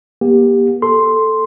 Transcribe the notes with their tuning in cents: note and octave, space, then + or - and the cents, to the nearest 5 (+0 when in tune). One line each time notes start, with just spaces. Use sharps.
A#3 +40 G4 +15
A4 +0 C6 +0